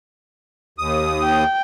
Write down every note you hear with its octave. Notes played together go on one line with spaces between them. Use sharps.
D#2 D#6
G5